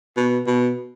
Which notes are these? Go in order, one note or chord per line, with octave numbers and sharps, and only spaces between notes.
B2
B2